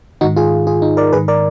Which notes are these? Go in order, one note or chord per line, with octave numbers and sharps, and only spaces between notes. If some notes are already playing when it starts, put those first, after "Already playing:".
G#2 D#3 D#4 F#4
F4 G#4
F4 G#4
D#4
A#4 D5
G#2 D#3 G#4 B4
A#4 D5